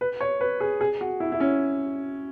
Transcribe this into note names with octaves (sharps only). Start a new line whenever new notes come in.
B4
C#5
B4
G#4
G#4
F#4
E4
E4
C#4